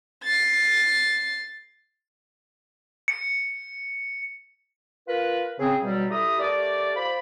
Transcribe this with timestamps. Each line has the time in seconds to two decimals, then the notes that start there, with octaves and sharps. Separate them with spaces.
0.24 A6 C7
3.08 C#7
5.07 F4 A#4 B4
5.59 C#3 C4 G#4
5.82 B2 F#3 G3
6.10 E4 G4 A4 E5 A#5 D#6
6.40 A3 G4 A#4 D5
6.95 F4 C5 D5 B5